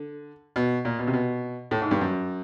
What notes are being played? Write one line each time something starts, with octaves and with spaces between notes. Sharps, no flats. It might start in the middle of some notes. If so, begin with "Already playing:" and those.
Already playing: D3
B2
A#2
B2
C3
B2
A2
G#2
G2
F#2